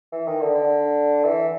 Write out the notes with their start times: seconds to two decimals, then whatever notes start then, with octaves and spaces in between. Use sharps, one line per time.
0.12 E3
0.27 D#3
0.40 D3
0.55 D3
1.24 E3